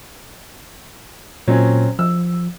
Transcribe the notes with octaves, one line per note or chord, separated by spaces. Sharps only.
A#2 F#3 C4 C#4
F3 E6